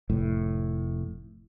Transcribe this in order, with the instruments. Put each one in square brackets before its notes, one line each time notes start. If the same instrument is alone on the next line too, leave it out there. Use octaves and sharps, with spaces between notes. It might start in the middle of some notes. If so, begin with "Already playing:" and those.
[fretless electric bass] F1 A2